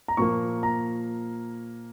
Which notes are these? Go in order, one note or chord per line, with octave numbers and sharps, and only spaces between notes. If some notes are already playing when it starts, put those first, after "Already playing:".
A#5
A#2 F3 A#3 C#6
A#5